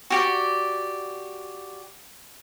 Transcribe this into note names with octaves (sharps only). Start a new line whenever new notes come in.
F#4 G4 D5